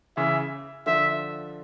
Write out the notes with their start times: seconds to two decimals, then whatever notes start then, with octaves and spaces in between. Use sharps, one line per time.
0.17 C#3 E3 E5
0.86 D3 F3 E5